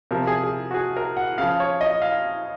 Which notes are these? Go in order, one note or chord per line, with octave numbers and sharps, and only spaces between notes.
C3 F3 A#4
G#4
G#4
F#4
G#4
A#4
F#5
C#3 F3 F5
C#5
D#5
F5